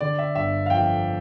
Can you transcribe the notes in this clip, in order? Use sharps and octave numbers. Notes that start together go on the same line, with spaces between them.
D3 D5
E5
G1 E5
F5
F2 G5